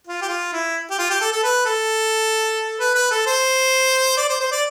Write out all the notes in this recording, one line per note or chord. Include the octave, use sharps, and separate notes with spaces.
F4
G4
F4
E4
G4
F4
G4
A4
A4
B4
A4
B4
B4
A4
C5
D5
C5
C5
D5